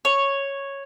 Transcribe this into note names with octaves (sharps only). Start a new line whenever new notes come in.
C#5